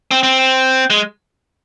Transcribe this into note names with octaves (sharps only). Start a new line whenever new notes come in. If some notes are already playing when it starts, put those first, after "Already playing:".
C4
C4
G#3